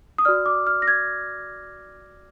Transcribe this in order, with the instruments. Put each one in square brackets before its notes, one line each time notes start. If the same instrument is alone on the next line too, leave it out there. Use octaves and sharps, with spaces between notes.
[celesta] D#6
F#4 D5 F6
D6
F6
A#6
G#6